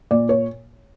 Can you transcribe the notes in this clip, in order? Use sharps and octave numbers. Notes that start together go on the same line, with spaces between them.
A#2 D5
C#5